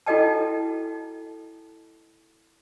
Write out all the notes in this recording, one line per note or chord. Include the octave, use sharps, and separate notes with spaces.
E4 F#4 A4 D#5 G5 A5